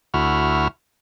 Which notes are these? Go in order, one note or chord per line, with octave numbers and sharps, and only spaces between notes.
D2 E4 F#4 F6